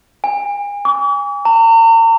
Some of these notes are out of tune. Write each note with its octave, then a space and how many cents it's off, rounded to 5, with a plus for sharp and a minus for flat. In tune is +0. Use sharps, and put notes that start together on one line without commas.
G#5 -35
D6 -45
A#5 -40